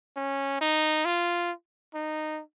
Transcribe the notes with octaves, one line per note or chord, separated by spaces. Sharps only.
C#4
D#4
F4
D#4